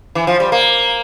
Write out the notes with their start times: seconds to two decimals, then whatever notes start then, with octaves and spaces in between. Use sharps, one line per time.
0.15 E3
0.27 F3
0.40 G3
0.52 A#3